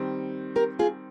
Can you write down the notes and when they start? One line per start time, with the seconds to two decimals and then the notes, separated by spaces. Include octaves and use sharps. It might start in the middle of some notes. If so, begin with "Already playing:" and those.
Already playing: D#3 G3 C4
0.56 G4 A#4
0.79 F4 G#4